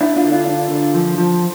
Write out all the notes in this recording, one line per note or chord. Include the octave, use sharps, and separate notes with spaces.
D4 E4
D4 F4
D3
D4 F4
D4
D3
F3
F3